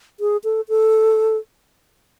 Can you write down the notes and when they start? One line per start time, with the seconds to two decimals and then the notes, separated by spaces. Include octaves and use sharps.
0.20 G#4
0.44 A4
0.69 A4